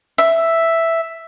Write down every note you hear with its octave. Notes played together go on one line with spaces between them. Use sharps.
E5